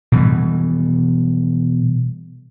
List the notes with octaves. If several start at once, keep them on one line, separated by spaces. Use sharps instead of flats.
B2 E3 G3